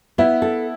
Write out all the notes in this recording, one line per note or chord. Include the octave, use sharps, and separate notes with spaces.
B3 E4
A4